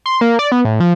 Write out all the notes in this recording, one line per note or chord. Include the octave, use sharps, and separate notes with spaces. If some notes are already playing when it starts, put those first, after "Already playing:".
C6
A#3
D5
B3
A2
F3